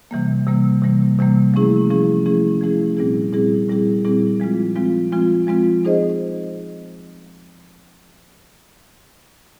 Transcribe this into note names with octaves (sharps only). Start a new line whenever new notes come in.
C3 E3 G3 A#3
C3 E3 G3 A#3
C3 E3 G3 A#3
C3 E3 G3 A#3
F3 A3 C#4 E4 G#4
F3 A3 C#4 E4 G#4
F3 A3 C#4 E4 G#4
F3 A3 C#4 E4 G#4
A#2 G3 C4 E4 G#4
A#2 G3 C4 E4 G#4
A#2 G3 C4 E4 G#4
A#2 G3 C4 E4 G#4
F3 G#3 C4 F4
F3 G#3 C4 F4
F3 G#3 C4 F4
F3 G#3 C4 F4
C4 D#4 G#4 C5 D#5